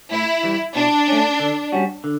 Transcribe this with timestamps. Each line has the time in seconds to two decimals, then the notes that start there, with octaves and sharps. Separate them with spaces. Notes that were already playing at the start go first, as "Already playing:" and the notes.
0.11 A2 E4
0.43 E3 G3
0.75 B2 D4
1.08 A3 C#4
1.40 D3
1.72 G3 C#4 F#4
2.04 D3